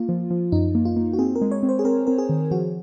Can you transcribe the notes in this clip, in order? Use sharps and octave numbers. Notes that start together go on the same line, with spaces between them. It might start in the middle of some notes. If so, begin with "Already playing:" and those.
Already playing: A#3 F4
F3
F3
F#2 D#4
A#3
F4
A#3
F#4
C4 G#4
A#4
G#3
C#5
C4
C5
G#4
C4 A#4
C4 A#4
G#4
D#3
F3 F#4